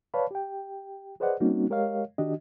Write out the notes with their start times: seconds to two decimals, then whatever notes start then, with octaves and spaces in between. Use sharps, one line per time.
0.14 B4 C#5 D5 F5 A5 B5
0.31 G4 G5
1.20 G#4 B4 C5 D5 D#5 F#5
1.40 G3 A#3 C4 C#4 D#4 F#4
1.70 G#3 G4 A#4 C#5 D#5 F5
2.18 D#3 D4 F#4 G4 D#5